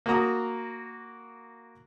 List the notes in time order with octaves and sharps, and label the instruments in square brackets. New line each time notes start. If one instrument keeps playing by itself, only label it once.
[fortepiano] A#3 F#4 A#5 D#6